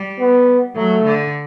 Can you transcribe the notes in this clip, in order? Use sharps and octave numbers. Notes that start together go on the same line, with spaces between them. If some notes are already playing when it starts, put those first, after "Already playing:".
Already playing: G3
B3
F#3 A3
D3